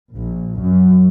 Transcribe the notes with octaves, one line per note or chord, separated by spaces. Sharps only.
A#1
F#2